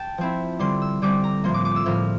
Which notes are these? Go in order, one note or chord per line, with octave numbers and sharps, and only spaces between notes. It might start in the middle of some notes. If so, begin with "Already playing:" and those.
Already playing: G5 A5
F3 C4 E4
D3 G3 C4 C6
E6
D3 G3 C4 D6
A#5
A2 F3 A#3 C6
D6
D6
E6
A2 F3 A#3 F6